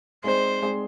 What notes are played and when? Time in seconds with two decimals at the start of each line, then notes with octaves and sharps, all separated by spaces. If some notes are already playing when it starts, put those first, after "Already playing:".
0.24 G#3 C4 D#4 G#4 C5 D5
0.62 G#3 C4 D#4 G#4 D5